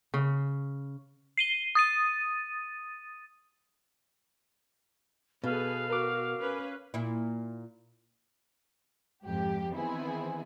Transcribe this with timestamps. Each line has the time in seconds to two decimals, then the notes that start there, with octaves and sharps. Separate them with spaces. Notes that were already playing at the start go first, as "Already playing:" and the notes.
0.14 C#3
1.38 C7 D#7 G7
1.75 D#6 A6 D#7
5.44 B2 G#4 A4 B4 F5
5.90 F#4 A#4 D6
6.41 C#4 B4
6.94 A#2 E4
9.25 F2 G#2 G4
9.72 D#3 E3 B3 C4 E4 G#4